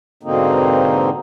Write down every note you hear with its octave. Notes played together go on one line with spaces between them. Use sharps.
G#2 B2 D3 A#3 C4 D#4